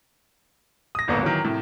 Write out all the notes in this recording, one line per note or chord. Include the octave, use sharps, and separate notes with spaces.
D#6 A#6
D#1 G#1 D3 A#3 B3 A#5
D#3 E3 F#3
A2 C3